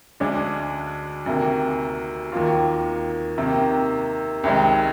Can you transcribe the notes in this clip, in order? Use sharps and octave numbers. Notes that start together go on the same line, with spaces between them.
D2 D3 G#3 D4 G#4
D2 C3 D#3 A#3
D#2 D#3 A#3 F4
C3 D#3 A#3
C2 C3 D#3 G#3